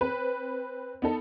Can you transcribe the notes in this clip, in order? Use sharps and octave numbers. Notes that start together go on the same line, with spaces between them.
C4 B4
B3 D#4 A4